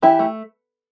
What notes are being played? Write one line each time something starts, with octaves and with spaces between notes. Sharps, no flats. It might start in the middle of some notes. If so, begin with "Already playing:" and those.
E3 E4 G4
A3